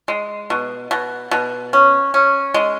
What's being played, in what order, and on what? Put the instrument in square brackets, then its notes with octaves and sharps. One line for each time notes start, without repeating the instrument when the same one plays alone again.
[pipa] G#3
B2
B2
B2
C#4
C#4
G#3